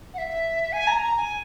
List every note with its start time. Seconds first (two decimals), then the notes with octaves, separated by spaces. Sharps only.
0.13 F#5
0.18 E5
0.72 G#5
0.87 A#5
1.02 A#5
1.16 G#5